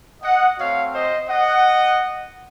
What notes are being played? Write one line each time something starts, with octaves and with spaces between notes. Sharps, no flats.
D#5 F#5
A3 C4 F#4 C#5 F5
C5 D#5
D#5 F#5